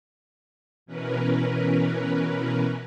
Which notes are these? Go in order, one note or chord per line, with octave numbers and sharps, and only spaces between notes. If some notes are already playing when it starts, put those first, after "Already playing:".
B2 E3 C#4 A#4 B4